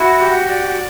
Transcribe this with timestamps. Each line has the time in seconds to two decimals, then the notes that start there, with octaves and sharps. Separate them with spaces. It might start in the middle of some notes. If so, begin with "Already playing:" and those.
Already playing: E4 F#4
0.20 G4
0.49 D5